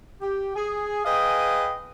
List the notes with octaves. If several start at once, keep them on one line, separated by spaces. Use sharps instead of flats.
G4
G#4
G#4 B4 D#5 F5 G5 G#5